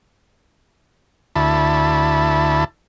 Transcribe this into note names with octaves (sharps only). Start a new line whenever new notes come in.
D2 E4 A5 B5